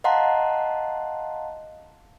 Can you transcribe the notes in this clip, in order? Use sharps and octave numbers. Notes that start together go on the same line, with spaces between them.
D#5 F5 F#5 A5 A#5 C6